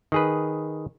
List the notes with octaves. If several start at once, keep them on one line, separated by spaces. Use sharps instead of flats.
D#3 G#4 B4